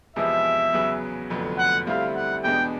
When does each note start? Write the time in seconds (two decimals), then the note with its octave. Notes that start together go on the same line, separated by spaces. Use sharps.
0.16 E2 C3 F3 G#3 B3 E5
0.73 E2 C#3 F#3 B3
1.30 F1 F2 D3 F#3 B3
1.58 F#5
1.87 D2 D3 G3 C4 E4 F5
2.16 F#5
2.44 E2 B2 G#3 B3 D4 G5